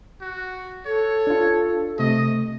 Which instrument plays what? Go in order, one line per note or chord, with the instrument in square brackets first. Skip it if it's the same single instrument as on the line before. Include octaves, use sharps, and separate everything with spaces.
[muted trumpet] F#4
[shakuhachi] A4 [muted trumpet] C#5
[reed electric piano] D4 F4
[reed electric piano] C3 A3 [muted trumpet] D#5